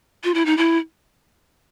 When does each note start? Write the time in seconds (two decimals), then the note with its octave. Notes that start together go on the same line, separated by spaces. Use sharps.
0.24 F4
0.34 E4
0.46 D#4
0.57 E4